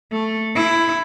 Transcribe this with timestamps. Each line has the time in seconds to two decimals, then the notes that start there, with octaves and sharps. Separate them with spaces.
0.12 A3
0.55 E4